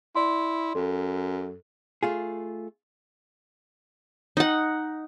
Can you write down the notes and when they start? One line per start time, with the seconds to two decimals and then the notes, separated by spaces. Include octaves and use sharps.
0.15 E4 D5 C6
0.75 F#2 A4
2.03 A3 F4 G#4
4.37 D#4 F#5